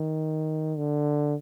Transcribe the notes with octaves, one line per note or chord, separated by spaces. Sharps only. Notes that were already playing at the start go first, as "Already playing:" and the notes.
Already playing: D#3
D3